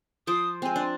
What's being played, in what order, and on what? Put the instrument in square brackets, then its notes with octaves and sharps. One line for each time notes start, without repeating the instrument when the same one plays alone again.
[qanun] F3 C5 D6 [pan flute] D#6
[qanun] G#3 C4 [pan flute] G#5
[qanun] D4